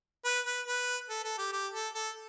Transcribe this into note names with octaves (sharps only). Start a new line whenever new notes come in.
B4
B4
B4
A4
A4
G4
G4
A4
A4